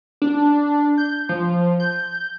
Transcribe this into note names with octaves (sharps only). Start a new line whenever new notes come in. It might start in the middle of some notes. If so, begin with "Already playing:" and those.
D4
G6
F3
G6